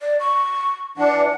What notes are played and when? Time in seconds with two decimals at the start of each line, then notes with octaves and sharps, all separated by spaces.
0.01 D5
0.20 C#6
0.98 E3 D4 F#5